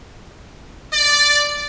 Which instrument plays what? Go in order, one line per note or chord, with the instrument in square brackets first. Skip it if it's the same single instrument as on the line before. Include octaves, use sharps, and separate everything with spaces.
[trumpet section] D5